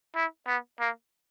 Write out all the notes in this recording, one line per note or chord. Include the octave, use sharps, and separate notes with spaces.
E4
B3
A#3